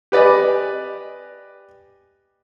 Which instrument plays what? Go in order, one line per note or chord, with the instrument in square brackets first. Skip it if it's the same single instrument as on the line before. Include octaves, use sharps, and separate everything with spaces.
[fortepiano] G4 B4 D5 D#5 G#5